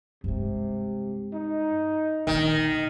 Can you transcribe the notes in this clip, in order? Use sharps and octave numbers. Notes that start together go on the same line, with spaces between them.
G2 C3 G#3
D#4
A#1 D3 D#3